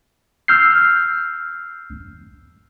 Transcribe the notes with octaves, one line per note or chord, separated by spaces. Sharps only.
E6 F6 G6 C7